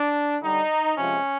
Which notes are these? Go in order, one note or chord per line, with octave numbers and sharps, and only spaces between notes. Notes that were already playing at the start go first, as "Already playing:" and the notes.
Already playing: D4
D3 G3 D#4
C3 F3 G#3 C#4